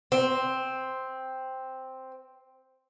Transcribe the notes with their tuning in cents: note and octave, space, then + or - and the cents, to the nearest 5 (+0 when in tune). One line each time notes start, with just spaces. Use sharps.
C4 +0